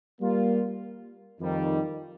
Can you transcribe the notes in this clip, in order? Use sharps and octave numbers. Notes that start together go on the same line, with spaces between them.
G3 A#3 F4
F2 D#3 G3